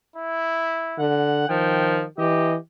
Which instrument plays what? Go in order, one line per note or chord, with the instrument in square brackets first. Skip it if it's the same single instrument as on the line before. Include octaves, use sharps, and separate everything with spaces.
[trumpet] E4
[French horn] D3 [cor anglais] F#5
[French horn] D#3 [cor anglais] F3 [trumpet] G5
[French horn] E3 [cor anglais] G4 [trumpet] D#5